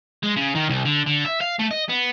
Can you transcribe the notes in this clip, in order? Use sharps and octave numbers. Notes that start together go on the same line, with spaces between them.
G#3
C#3
D#3
C2
D3
D3
E5
F5
A3
D#5
B3